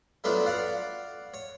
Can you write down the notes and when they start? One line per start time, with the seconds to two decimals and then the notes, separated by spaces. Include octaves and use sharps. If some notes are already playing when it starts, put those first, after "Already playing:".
0.24 F#3 A3 B3 D4 F4 F#4
0.46 D5 F5 F#5
1.34 C#5